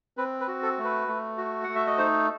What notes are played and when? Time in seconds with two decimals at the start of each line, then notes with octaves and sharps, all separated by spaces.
0.17 C4 B4
0.40 B4
0.48 F#4
0.63 A4
0.78 A3
0.84 B4
1.08 A3
1.38 F#4
1.64 A3 F#5
1.75 E5
1.87 D#5
1.98 D#4 C5